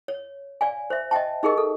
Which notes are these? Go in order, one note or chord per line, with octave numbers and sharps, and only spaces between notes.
C#5
D5 F5 G#5
C5 E5
D#5 E5 G5 A5
D#4 G4 G#4 A#4 D#5
A4